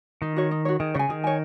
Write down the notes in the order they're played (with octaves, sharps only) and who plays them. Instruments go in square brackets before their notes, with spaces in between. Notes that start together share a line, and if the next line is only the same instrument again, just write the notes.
[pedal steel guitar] D#3 [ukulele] D#4
[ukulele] F#4 C#5
D#4
F#4 C#5
[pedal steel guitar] D#3 [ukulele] G#4
[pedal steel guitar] C#3 [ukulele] C#5 G#5
[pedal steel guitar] D#3 [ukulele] G#4
[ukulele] C#5 G#5